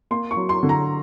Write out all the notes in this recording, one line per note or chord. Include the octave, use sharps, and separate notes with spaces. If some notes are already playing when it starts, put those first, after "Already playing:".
A#3 C6
C#6
F#3
C6
D3
A#5